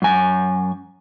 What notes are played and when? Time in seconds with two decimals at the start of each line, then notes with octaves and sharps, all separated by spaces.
0.02 F#2 G#5